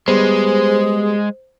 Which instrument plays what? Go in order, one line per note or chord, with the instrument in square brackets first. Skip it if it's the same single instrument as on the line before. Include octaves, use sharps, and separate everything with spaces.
[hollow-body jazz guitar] G3 B3 [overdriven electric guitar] G#3 [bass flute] G#4 [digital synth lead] C5